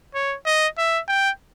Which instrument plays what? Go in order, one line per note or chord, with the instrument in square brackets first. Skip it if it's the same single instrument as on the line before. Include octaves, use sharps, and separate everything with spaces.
[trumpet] C#5
D#5
E5
G5